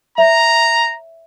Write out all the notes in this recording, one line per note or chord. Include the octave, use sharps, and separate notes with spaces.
C#5 E5 A#5